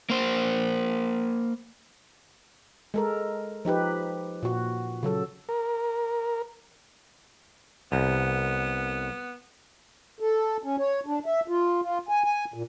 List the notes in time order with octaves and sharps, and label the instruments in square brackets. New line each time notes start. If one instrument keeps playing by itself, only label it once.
[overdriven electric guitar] A#3 C5
[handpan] G#3 A4 A#4
F3 D#4 G4 B4
A#2 F#4
C#3 F#3 A4
[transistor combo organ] A#4
[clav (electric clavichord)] C2 [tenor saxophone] B3
[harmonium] A4
C#4
C#5
D4
E5
F4
F4
G#5
G#5
A#2